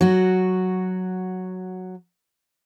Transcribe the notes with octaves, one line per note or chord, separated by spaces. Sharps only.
F#3 F#4